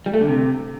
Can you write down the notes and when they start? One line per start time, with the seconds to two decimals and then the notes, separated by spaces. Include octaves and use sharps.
0.06 G3
0.14 A3
0.21 D3
0.28 C3